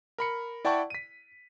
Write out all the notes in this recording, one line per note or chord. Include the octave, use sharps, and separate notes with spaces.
A#4 B5 C#7
E4 D5 F#5 G5 A5 C#6
B6 D#7